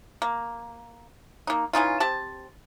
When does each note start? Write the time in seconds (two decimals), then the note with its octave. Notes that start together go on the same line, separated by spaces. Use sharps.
0.22 A#3
1.47 A#3 D#4
1.73 E3 C#4 D#4 F4
2.00 C4 G4 A5